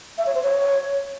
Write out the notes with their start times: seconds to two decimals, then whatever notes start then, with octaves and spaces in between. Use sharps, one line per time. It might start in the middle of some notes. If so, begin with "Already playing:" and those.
0.18 E5
0.26 C#5
0.35 C5
0.43 C#5